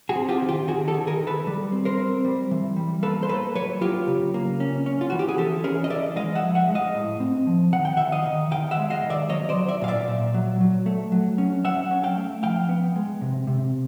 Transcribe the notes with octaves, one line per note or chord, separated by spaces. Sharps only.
F#4 G#4
C4
F4 G4
D#3
F4 G4
D#3 F#4 G#4
G4 A4
D#3
G#4 A#4
D#3
A4 B4
G3
C4
A#4 C5
C4
G3
E3
G3
A#3 A4 B4
C5
A#3 A4 B4
F#3 B4 C#5
F#3 F4 G4
C#3
A#3
C#4
C#4
F4
E3 F#4
G4
G#4
E3 G4 A4
C#4 G#4 A#4
D#5
E3 D5 E5
G#3 D#5 F5
E5 F#5
F3
E5 F#5
G#3
D#5 F5
A2
C4
F3
D#3 F#5
G5
D#3 E5 F#5
D#5 F5
D#3
D#3 F5 G5
E5 F#5
G#3
D#5 F5
D#3
D5 E5
F#3 C#5 D#5
C5 D5
F#3
D5 E5
A#2 F5
D5 E5
A#2
F#3
F#3
A3
F#3
C#4
F#3 E5 F#5
C#4
F5 G5
A3
F3 F5 G5
B3
G#3
C3
C3